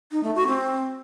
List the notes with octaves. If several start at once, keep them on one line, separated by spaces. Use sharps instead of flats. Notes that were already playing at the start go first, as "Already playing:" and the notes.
D#4
A3
F#4
C4